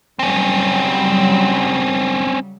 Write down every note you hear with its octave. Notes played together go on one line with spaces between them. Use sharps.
C#3 F#3 G3 C4 C#4